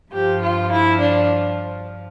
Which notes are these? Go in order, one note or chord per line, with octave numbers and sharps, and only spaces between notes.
G2 F3 G4
F4
E4
D4